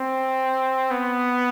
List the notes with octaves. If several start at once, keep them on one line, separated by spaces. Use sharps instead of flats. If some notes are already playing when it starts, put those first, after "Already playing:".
Already playing: C4
B3